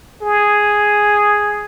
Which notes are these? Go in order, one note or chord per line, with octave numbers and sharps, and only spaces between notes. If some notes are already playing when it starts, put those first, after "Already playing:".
G#4